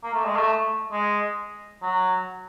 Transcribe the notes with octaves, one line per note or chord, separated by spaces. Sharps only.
A#3
A3
G#3
A3
G#3
F#3